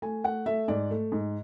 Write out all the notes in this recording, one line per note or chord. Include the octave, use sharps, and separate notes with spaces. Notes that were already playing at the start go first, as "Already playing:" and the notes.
A3 G#5
A3 F#5
A3 E5
G#2 D5
A3
G#2